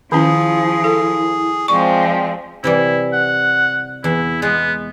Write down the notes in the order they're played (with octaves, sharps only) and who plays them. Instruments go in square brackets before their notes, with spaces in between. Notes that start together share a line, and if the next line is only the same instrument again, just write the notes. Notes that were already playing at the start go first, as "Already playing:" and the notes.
[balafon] D#3 C#4 [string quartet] F3 [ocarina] E4 [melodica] G#4
[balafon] A4
[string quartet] F3 G#3 C4 [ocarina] D5 [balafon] C#6
[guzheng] C3 E3 G3 [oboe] E4
[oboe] F#5
[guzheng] E2 [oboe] E4
[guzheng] G#3 [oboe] B3